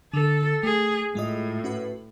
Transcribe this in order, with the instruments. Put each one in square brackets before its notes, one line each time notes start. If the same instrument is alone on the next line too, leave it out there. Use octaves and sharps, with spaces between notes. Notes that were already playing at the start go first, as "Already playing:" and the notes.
[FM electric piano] D3 [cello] A4
[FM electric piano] A3 [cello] G#4
[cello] A2 [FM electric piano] G#3 F4 D#5
[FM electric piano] C#4 F#4 B4